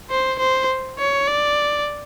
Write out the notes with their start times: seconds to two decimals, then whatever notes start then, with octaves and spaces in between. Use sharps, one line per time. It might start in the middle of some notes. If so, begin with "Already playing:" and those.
0.10 C5
0.39 C5
0.99 C#5
1.28 D5